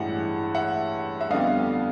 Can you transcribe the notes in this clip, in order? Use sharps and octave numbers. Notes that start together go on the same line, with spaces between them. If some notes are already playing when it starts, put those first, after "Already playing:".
Already playing: A1 G2 E3 G#3 E5 F#5
E5 F#5
E5
F2 D3 G3 B3 D4 D#5 F5